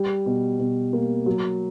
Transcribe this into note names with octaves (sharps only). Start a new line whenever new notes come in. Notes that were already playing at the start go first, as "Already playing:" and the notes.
Already playing: G3
B2
B2
A#3
F#3